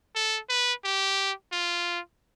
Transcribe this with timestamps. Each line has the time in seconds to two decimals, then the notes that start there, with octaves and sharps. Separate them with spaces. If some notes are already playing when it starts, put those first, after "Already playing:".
0.16 A4
0.49 B4
0.84 G4
1.52 F4